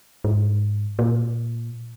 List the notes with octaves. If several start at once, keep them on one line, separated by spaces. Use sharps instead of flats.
G#2
A#2